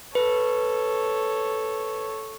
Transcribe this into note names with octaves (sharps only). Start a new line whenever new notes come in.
A4 B4 C#5